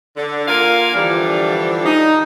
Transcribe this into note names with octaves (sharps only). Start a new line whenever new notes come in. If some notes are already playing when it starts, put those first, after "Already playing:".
D3
A#3 F4 A#4 F5 G#5
D3 E3 F3 G3 D4
D#4